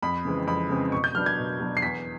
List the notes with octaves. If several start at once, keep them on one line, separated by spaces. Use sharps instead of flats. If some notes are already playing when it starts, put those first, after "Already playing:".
F2 B5
C#3 E3 G#3 C4
F2 B5
C#3 E3 G#3 C4
B2 C#6
G6
F#3 B3 D4 F6
G#6
B2
F#3 B3 D4
C7
E2 B6